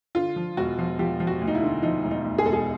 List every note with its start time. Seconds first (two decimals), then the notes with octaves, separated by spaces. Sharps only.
0.15 D3 F4
0.36 F3
0.57 E1 F#4
0.79 F3
0.99 F3 G4
1.20 F3
1.27 F#4
1.41 D2
1.47 D#4
1.55 E4
1.62 D3
1.83 F3 D#4
2.04 E1
2.11 D#4
2.24 D2
2.38 G#4
2.46 E1 A4
2.53 G#4